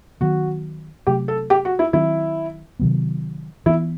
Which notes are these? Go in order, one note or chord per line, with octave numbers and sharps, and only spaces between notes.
D#3 F#3 B3 F#4
C3 F#3 A3 G4
A4
G4
F#4
E4
D#3 F#3 C4 E4
C3 D#3 F#3 B3
E3 B3 E4